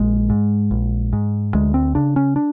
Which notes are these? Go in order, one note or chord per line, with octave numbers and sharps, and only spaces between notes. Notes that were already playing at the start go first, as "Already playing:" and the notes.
Already playing: A#1 G#3
G#2
A#1
G#2
D2 G#3
C4
C#3 D4
C#4
D4